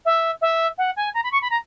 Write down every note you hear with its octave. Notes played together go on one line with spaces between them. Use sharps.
E5
E5
F#5
G#5
A#5
B5
C#6
B5
A#5